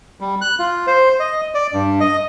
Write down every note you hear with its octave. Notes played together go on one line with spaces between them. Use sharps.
G3
F#6
F4
C5
D#5
D5
G2
D#5